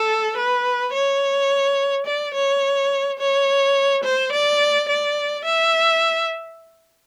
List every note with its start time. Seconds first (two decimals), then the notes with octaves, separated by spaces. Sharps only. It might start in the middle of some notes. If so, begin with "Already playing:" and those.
Already playing: A4
0.37 B4
0.93 C#5
2.06 D5
2.34 C#5
3.19 C#5
4.04 C5
4.32 D5
4.89 D5
5.45 E5